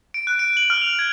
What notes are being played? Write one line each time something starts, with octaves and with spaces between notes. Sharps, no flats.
D7
F#6
D7
F#7
F6
F7
G#6